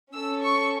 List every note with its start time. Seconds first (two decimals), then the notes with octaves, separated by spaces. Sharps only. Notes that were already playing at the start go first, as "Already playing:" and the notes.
0.14 C#4 A4 E6
0.42 C#6